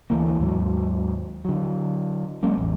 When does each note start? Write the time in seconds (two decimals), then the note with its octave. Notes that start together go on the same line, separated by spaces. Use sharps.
0.10 D2 E3 A3 A#3
0.40 D#2 G#2 F#3
1.45 D3 F#3
2.43 F#3 G#3 A#3 C#4
2.58 A1 E2